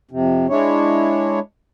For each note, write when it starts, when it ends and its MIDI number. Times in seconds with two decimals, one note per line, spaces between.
0.11 0.47 41
0.11 0.47 48
0.50 1.39 56
0.50 1.39 62
0.50 1.39 64
0.50 1.39 73